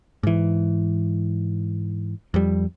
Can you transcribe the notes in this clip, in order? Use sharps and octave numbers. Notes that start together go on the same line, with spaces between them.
G#2 E3
F2 G3